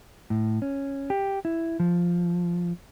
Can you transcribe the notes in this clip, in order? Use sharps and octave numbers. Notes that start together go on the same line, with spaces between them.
A2
C#4
G4
E4
F3